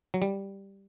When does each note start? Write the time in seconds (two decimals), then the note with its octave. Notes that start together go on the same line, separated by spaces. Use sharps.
0.14 F#3
0.22 G3